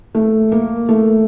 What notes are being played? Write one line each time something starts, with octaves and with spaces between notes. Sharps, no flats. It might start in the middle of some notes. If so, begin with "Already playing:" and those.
A3
A#3
A3